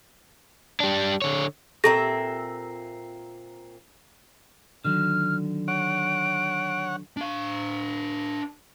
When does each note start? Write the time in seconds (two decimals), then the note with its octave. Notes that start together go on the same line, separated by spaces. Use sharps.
0.80 G3 D4
1.22 D3 C#5
1.84 A#2 C4 G4 A4 E5 A5 A#5 A#6
4.85 D3 D#3 F#3 F6
5.68 C#5 F#5 D7
7.17 D4 F5